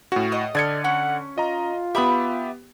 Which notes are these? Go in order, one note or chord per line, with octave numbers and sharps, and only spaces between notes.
A2 C#4 F#4
D#5
D3 A4 D5 D#5 F6 G#6 C#7
C#4 F#5
F4 D#5 A#5
B3 G4 E5 B5 D#6